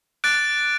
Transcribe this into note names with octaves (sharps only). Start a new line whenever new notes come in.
D6 F#6 A6 D7